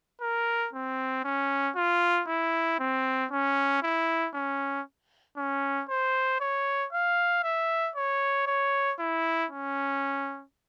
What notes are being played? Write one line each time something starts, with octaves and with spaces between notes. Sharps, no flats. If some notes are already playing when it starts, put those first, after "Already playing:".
A#4
C4
C#4
F4
E4
C4
C#4
E4
C#4
C#4
C5
C#5
F5
E5
C#5
C#5
E4
C#4